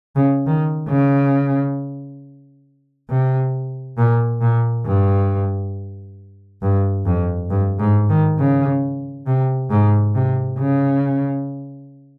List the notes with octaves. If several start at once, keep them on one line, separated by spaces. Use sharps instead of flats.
C#3
D#3
C#3
C3
A#2
A#2
G2
G2
F2
G2
G#2
D#3
C#3
C3
G#2
C3
C#3